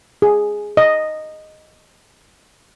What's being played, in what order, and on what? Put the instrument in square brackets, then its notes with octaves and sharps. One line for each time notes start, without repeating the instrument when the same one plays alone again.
[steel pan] G#4
D#5